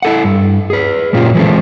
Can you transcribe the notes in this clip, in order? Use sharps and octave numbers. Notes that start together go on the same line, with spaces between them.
E4 A4 F#5
G2
G#4 B4
F#2 A#2 C#4 F4 G4
E3 G#3 C4 A4 C5